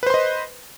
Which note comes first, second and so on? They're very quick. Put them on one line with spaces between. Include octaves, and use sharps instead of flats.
B4 C5 C6 D#5